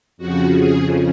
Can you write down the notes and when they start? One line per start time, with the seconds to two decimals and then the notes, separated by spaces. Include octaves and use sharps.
0.17 F2 C#3 F3 F#4
0.54 G#4